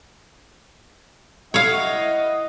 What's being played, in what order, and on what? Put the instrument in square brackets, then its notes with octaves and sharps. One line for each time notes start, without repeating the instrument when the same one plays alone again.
[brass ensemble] E4 D#5 F#5 [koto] C#5 F5